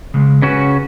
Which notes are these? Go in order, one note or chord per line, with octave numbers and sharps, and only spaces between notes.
C#3 G#3
C#3 C#4 F#4 B4